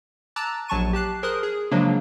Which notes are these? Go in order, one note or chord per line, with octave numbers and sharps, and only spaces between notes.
A5 A#5 D6 E6 F#6 A6
A#1 F#3 A5 C#6 D#7
G4 A5 F#6 C7
G#4 A#4 C5 C6 D#6 F#6
G#4
C#3 F3 F#3 G#3 A#3 D4